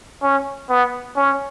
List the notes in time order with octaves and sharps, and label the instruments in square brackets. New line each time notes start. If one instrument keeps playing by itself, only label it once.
[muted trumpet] C#4
B3
C#4